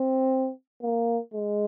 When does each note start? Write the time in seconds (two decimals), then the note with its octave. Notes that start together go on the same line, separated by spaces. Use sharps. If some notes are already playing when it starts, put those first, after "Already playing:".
Already playing: C4
0.82 A#3
1.34 G#3